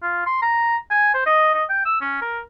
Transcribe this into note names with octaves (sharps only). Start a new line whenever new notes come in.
F4
C6
A#5
G#5
C5
D#5
D#5
G5
E6
C#4
A#4